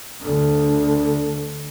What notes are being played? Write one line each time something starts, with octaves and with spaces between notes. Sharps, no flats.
D2 D3